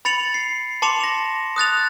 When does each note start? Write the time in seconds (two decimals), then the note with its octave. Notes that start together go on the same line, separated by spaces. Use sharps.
0.05 B5 A6 C#7 F7 F#7
0.34 C7
0.82 A5 C6 D6 C#7 E7 F7
1.01 A#6 F7
1.56 D#6 F#6 A6 F7